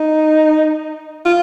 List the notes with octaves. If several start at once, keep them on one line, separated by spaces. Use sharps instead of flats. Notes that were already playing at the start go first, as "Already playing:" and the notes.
Already playing: D#4
F4